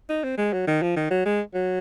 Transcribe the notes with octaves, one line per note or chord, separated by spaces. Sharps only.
D#4
C4
G#3
F#3
D#3
F3
D#3
F#3
G#3
F#3